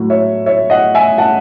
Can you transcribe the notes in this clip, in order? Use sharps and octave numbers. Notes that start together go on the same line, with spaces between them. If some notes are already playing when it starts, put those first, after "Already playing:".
Already playing: A2 F#3
C#5 E5
C#5 E5
D#5 F#5
E5 G#5
F#5 A5